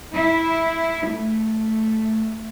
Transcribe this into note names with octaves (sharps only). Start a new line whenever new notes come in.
E4
A3